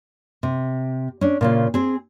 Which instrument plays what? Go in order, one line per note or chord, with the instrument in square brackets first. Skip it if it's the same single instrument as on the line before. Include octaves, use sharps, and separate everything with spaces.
[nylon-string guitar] C3
C#4 D4
A#2 C#3 F4
C4 G#4